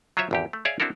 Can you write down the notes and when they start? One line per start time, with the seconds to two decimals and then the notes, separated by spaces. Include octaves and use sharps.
0.17 F#3 F4 C5 C#5 E5
0.31 G#1 E2 G4
0.53 A3
0.65 G#4 C#5 D5 E5 F5
0.80 C4 D4 E4 F#4 A4 A#4